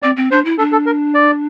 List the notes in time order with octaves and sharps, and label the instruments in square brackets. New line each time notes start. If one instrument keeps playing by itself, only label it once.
[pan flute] C4 [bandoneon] D5
[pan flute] C4
[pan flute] D4 [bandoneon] C5
[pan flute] E4
[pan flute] D4 [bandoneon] A4
[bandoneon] A4
A#4
D5